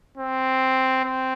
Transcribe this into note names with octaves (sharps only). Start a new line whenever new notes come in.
C4
C4